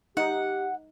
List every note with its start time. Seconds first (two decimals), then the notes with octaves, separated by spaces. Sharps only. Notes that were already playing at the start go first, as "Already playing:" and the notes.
0.17 D#4 G4 F#5